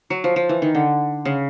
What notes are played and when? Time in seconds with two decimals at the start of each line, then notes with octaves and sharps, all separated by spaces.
0.10 F#3
0.24 F3
0.36 F3
0.49 E3
0.62 D#3
0.75 D3
1.25 C#3